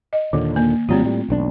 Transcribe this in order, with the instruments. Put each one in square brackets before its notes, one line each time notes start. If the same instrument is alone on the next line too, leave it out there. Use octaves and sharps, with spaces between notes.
[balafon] D#5
[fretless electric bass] D#2 A#2 D3 [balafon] D#3
[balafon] A#3
[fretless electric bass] G#1 F#3 G3 [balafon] A3 C4 F4
[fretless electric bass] A2 G3
E1 B1 D4